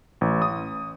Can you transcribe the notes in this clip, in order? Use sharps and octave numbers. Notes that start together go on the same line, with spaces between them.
A1
D#6